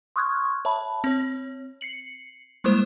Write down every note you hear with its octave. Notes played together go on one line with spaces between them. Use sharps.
C6 C#6 D#6 F6 F#6 G#6
C#5 E5 A5 B5
C4 C#5
C7 C#7 F#7
G3 G#3 A#3 E4 C5 E7